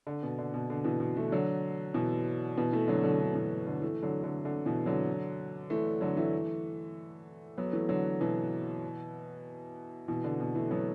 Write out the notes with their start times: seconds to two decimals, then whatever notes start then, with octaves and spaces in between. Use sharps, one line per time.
0.07 D3
0.23 B2
0.38 D3
0.54 B2
0.70 D3
0.84 B2 E3
1.00 B2
1.17 E3 A3
1.32 D3 F#3
1.94 B2 E3
2.58 B2 E3
2.73 E3 A3
2.88 D3 F#3
3.03 D3 F#3
3.20 D3
3.35 B2 E3
3.67 D3
3.82 E3 A3
4.03 D3 F#3
4.24 D3
4.45 D3
4.66 B2 E3
4.86 D3 F#3
5.70 E3 A3
6.01 D3 F#3
6.17 E3 A3
7.58 F#3 B3
7.73 E3 A3
7.89 D3 F#3
8.21 B2 E3
10.08 B2 E3
10.24 D3
10.40 B2
10.55 E3 A3
10.71 F#3 B3